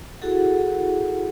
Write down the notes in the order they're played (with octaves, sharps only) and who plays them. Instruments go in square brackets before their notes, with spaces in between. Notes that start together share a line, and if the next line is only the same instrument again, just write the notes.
[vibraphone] E4 F#4 G#4 A4 F#5